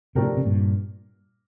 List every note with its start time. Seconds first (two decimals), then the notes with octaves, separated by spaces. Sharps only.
0.15 A2 C3 F3 A3 D4 G4 A#4
0.37 C3
0.45 G2 A#2